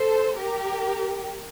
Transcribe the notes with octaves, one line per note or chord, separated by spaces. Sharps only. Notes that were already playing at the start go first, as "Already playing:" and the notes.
Already playing: A4 C5
G4 A#4